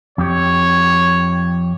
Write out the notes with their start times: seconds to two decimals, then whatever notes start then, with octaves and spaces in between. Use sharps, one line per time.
0.18 F2 G4 C#5